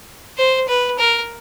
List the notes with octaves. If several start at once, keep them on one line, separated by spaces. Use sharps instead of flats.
C5
B4
A#4